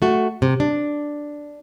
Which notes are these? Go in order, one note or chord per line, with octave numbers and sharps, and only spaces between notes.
A3 F#4
C3
D4